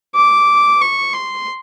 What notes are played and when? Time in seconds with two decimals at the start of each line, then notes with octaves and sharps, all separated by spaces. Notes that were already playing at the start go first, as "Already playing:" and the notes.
0.15 D6
0.81 C#6
1.13 C6